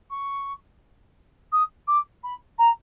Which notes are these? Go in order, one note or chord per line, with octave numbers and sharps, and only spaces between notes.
C#6
D#6
D6
B5
A#5